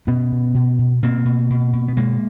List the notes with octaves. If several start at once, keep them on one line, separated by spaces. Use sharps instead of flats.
B2 B3 C#4
B2
B2
B2
B2 A#3 C4
B2
B2
B2
B3
B2 G#3 A#3